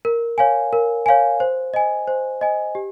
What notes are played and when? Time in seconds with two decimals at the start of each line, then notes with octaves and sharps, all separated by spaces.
0.05 A#4
0.38 C#5 F5 G#5
0.73 A#4
1.06 C#5 F5 G#5
1.40 C5
1.74 D#5 G#5
2.08 C5
2.41 D#5 G#5
2.75 G4